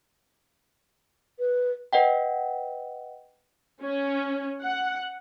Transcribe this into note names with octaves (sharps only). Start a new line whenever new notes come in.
B4
B4 D#5 F#5 G5
C#4
F#5